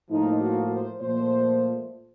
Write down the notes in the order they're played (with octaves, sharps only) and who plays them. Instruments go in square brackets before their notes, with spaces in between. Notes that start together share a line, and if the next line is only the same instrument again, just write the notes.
[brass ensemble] A2 F3 A#3 D#4
F#4
C5
A#2 F3 A3 C5